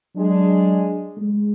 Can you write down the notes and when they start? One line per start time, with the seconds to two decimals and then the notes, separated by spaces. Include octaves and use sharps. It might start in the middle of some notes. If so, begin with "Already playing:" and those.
0.15 F#3 G#3 D4 G#4
1.17 G#3